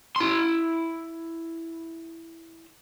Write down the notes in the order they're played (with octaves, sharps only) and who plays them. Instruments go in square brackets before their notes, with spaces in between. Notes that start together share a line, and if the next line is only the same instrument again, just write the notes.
[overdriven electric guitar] E4 C6